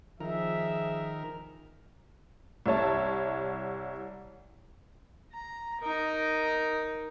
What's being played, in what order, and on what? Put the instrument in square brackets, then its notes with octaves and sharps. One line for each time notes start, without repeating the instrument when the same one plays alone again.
[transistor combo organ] D#3 A#4 [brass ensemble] F3 G#4 E5
[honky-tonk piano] C2 E4 C#5 A5
[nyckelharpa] A#5
D#4 A#4